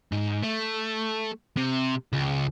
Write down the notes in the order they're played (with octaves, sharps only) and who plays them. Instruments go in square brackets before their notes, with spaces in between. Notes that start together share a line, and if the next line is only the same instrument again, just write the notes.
[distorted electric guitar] G#2
A3
C3
C#2